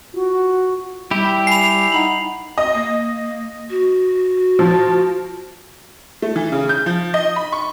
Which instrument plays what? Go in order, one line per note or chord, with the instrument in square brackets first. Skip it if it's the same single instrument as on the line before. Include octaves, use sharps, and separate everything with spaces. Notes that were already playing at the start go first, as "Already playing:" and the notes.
[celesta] F4 [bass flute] F#4
[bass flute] G3 [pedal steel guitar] E4 G4 [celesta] B5
[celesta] G#5 B5 [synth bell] C7 F7
[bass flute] D#4 [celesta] F#5 B5 F#7
[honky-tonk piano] D#5
[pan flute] A#3
F#4
[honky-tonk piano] F3
A3
E3
C#3
G6
F3
D#5
B5
C#6